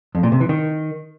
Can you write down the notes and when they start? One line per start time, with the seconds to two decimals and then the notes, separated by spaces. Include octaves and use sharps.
0.15 F2
0.23 A#2
0.32 C3
0.41 E3
0.49 D#3